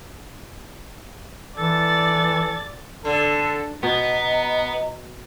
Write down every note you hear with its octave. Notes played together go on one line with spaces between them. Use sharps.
E3 A4 D5 A6
D3 A4
B2 B3 D#5 A#5